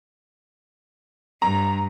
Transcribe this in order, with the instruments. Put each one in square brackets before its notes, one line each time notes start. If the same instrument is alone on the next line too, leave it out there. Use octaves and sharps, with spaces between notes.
[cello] G2 [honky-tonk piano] A#5